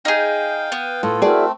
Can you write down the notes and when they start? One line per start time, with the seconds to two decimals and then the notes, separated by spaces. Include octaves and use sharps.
0.05 D#4 G#4 F5 G5
0.72 B3
1.03 A2 F4 A4
1.22 A3 C4 E4 F#4 G#4 A#4 D5